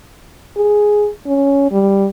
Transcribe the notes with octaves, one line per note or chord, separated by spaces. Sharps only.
G#4
C#4
G3